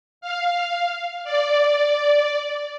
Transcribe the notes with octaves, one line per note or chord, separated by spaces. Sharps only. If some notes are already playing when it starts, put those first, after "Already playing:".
F5
D5